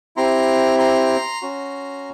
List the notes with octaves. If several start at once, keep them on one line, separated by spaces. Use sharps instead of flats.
C4 E4 G4 A#5 C6
A#5 C6
C#4 F#4